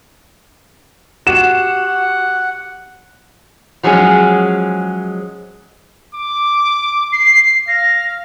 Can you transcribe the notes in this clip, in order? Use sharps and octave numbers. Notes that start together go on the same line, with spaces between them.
F#4 G4 F#5 E7
F3 F#3 G#3 C#4 G#4
D6
C7
F5 A#6